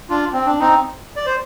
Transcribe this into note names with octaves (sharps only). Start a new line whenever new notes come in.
D4 F4
C4
D4
C4 D#4
D5
C5